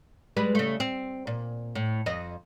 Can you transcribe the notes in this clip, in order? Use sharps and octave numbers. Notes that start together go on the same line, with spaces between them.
G3 G#3 B4
C#3 A3
C4
A#2
A2
F2 D#5